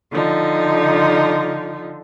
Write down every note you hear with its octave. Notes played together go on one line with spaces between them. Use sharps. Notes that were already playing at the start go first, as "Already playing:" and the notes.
D3 F3 D#4